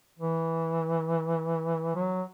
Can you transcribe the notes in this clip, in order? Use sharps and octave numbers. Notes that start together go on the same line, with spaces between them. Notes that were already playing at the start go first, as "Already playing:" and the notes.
E3
F#3